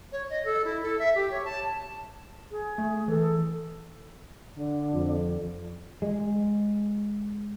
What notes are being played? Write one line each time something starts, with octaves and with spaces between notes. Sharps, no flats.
C#5
D#5
A4
E4
A4
E5
G4
C#5
A5
G#4
A3
E3 A4
D3
F2
G#3